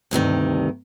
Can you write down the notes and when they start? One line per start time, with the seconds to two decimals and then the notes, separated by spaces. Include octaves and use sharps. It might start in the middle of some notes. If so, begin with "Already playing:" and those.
0.11 D2 G2 C3 D#3